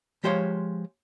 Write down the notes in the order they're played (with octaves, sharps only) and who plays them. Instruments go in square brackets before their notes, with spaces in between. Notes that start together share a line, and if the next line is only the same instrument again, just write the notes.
[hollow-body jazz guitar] F3 G#3 G4 C5 C#5 F5